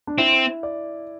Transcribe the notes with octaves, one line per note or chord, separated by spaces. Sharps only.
D4
C4 E4
D5